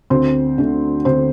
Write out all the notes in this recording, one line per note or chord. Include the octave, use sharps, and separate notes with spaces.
D2 C4 C5
D3 A3
D2 C4 C5